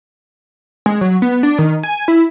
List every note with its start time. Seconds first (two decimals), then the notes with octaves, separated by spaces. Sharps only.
0.86 G#3
1.01 F#3
1.22 B3
1.43 D4
1.58 D#3
1.83 G#5
2.08 E4